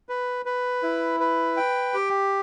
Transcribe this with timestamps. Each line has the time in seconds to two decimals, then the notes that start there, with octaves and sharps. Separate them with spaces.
0.09 B4
0.46 B4
0.83 E4
1.20 B4
1.57 G5
1.94 G4